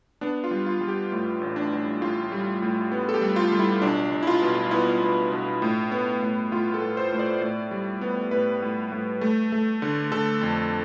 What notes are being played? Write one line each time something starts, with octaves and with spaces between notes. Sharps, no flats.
B3 D4
F4
G3
F4
G3
G4
A2
A1
D4
A1
A2 F4
G3
A2
B3
A4
G4
G3
F4
G3
E4
B1 D4
B1
E4
F4
B2
B3 E4
B3
B2
A2
B3
A2
A2 F4
A4
A2
C5
A2
D5
A2 D5
G3
B3
A2 B4
A2
A2
A3
A3
D3
D3 A4
F2